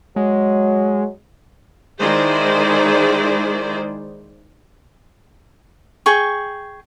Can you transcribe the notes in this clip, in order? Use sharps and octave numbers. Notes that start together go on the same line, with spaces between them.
F#3 G#3
D#3 G#3 E4 G#4 C5 D5
G#4 G5 C#6